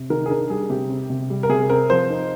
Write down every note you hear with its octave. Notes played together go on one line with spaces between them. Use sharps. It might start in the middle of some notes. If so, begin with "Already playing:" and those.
Already playing: C3
D#3 A#4
G#4
D4 A#4
G3 G#4
C3 G4
C4
C3
G3
A#4
C3 G#4
C4 A#4
F3 C5
D#4